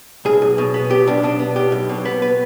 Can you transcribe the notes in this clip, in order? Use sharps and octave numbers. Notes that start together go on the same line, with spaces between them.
B1 G#4
B1
B2
B3
B1 G4
B1 D4
B2 D4
B3
B1 G4
B1
B2
B3
B4